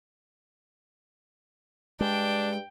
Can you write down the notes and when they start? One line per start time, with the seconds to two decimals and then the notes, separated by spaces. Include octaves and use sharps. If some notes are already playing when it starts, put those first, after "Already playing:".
2.01 G2 G#3 D4 G5